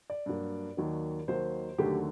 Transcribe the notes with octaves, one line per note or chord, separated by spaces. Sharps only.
D5
G2 F#3 A#3
D#2 D#3 F#3 A#3
D#2 D#3 F#3 A#3 C5
D#2 D3 F#3 A3 G4